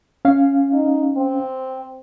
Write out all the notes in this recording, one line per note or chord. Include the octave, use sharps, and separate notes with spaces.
C#4 F5
D#4
C4